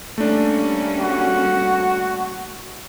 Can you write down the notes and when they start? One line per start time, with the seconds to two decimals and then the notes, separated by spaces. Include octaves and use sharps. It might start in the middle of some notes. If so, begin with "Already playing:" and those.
0.18 G3 A3 A#3 C#4 D4
1.00 F#4